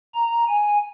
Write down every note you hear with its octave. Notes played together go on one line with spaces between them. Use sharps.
A#5
G#5